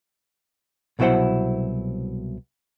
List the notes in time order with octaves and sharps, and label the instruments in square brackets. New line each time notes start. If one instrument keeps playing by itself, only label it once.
[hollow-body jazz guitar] C2 B2 F#3 E4 C5 F#5